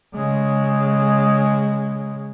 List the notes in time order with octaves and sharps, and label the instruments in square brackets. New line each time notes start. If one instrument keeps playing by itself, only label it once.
[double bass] C#3 G#3